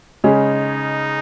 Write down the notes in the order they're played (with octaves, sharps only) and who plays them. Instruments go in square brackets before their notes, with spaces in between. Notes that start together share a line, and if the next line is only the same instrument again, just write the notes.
[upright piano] C#3 G#3 C#4 [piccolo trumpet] D#4